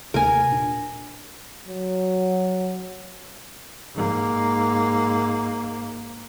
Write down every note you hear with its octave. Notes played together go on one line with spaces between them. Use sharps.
D#2 C3 A3 A#4 G#5
A#2 D4
F#3
G#2 A#3